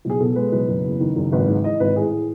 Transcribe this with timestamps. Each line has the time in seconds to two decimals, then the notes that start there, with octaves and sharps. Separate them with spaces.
0.05 B1 G#4
0.20 B2 A4
0.36 G#3 B4
0.52 B1 B4
0.69 F#1
0.84 E2
1.00 D#3
1.16 F#1
1.32 G#1 B4
1.48 G#2
1.64 E3 D#5
1.80 G#1 B4
1.96 A2 G#4
2.12 E3